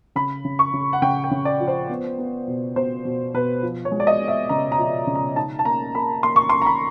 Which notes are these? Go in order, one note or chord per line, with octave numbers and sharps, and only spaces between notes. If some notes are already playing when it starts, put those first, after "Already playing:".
C#3 B5
C#3
C#6
C#3
F#5
C#3 G5
G5
C#3
D5
F3
C5
B3
B3
B2
B2 C5
B2
B2 B4
F3
C#5
G#3
D5
D#5
B3
E5
C#3 A#5
A#5
F3
C#3
A#5
D#4 A5
A5
A#3 A#5
A#3 B5
A#3 C6
C#6
C6
A#3
A#5
B5